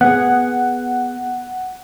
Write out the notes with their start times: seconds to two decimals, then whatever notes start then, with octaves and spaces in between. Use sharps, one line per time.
0.01 B3 G#4 F#5